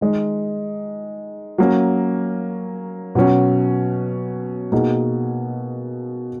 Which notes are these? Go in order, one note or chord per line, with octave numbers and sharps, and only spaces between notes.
D#3 G#3 D#4
F#3 A#3 C#4
B2 F#3 C#4 F#4
B2 A#3 D#4 G#4